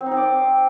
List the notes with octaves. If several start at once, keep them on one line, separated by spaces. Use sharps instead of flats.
C4
D#4
C4
D5
C5